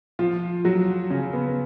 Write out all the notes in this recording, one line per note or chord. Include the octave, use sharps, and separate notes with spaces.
F3 F4
F#3 F#4
C#3 C#4
B3